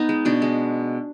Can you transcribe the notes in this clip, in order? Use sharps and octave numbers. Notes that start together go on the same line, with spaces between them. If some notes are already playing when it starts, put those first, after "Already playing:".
Already playing: B3 D#4
G#3
B2 D4
G#3